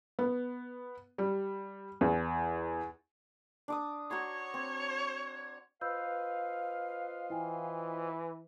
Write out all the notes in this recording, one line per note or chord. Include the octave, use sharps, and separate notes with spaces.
B3
G3
E2
D4 D6 D#6
F#4 C#5 A#5 C6 G#6
C4
F4 B4 C5 D#5 F5 B5 E6 G6
E3 E4 G5 G#5